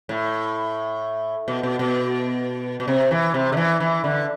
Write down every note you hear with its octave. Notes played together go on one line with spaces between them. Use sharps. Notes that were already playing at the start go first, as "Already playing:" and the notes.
A2
B2
B2
B2
B2
C3
E3
C3
D3
E3
E3
D3